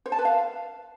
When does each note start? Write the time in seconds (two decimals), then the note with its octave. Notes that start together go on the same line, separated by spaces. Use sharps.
0.06 C5
0.12 A5
0.19 B4
0.25 F5